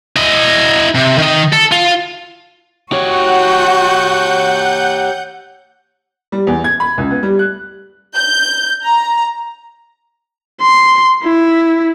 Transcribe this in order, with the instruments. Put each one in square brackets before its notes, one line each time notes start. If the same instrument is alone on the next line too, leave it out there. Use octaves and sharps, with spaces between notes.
[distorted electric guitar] E4 D#5
C3
D#3 D#5
A4
F4
[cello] F#4 [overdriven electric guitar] G4 C#5 [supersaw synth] F#5 G6
[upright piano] G3
E2
G#6
B5
C#2
B3
G3
F#6
[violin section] G6
A#5
[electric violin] C6
E4